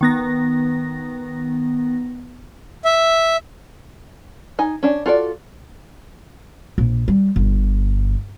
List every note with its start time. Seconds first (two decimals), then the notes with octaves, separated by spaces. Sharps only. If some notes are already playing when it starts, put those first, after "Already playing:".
0.01 D#3 B3 A#6
2.85 E5
4.59 D#4 G#5
4.83 C#4 D4
5.06 F4 F#4 A4 C5 D5
6.78 A#1
7.08 G3
7.36 G1